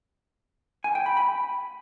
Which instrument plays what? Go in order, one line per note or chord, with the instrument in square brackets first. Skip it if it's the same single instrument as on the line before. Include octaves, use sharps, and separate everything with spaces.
[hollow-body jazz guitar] G#5
G5
B5
B5